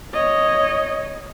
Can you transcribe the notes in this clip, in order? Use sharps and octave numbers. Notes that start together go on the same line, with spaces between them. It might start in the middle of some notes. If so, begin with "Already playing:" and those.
C#5 D#5